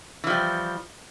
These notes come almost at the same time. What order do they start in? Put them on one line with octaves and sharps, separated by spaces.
E3 F3 G3